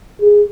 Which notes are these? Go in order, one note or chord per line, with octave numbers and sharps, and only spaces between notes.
G#4